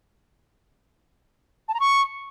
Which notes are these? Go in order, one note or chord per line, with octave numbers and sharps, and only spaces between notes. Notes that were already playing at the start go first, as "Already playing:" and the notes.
A5
A#5
C#6